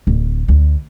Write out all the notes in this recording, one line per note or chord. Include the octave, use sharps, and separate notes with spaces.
D1
D2